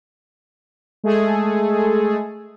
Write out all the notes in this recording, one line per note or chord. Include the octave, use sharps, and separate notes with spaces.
G#3 A3 G#4 A4